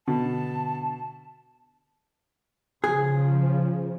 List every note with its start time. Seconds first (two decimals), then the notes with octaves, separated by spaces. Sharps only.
0.08 B2 D3 A5
2.84 C#3 F3 G#4